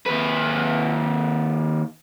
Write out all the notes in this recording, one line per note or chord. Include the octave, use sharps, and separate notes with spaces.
D#2 B4